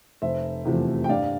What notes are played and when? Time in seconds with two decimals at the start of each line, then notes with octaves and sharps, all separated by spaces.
0.22 F1 C5 E5
0.65 E2 C3 F3 A3
1.04 G5
1.09 G2 D5 F5